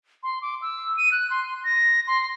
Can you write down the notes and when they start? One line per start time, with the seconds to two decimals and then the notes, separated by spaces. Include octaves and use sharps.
0.23 C6
0.42 D6
0.62 E6
0.97 D#7
1.12 F#6
1.30 C6
1.64 A#6
2.07 C6